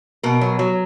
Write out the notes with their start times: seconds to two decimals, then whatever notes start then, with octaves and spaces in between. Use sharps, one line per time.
0.23 B2 A#4
0.41 F#3
0.59 F#3